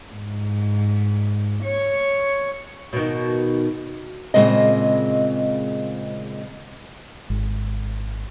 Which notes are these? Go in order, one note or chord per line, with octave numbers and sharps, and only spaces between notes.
G#2
C#5
B2 D#3
A#2 C#3 G#3 C4 D#5
G#1